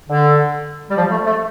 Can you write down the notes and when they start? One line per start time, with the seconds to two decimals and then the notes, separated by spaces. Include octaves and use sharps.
0.09 D3
0.89 G3
0.96 F3
1.11 A3
1.26 A3